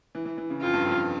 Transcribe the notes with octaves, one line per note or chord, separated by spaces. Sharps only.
E3
E3
E3
C#3
F2 F4
G2
F2